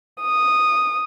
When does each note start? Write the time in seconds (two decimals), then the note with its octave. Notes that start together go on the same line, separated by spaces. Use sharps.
0.22 D#6